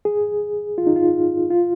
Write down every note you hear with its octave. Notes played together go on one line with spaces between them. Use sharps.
G#4
F4
D#4
F4
F4